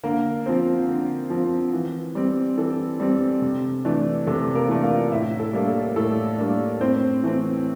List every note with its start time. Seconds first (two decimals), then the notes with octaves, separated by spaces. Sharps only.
0.04 D3 A#3 A#4
0.46 F3 C4 C5
0.88 D3
1.30 F3 C4
1.73 E3
2.15 G3 C4
2.57 E3 A4
3.00 G3 C4
3.42 C3
3.85 E3 A3 D4
4.27 C3 A4
4.55 A#3 A#4
4.69 E3 A3 D4
4.83 F4 F5
5.11 A2 E4 E5
5.39 A4
5.53 G3 A#3 D4
5.68 A4
5.96 A2 A4
6.38 G3 A#3 D4
6.81 A2 C4 C5
7.23 E3 A3 C4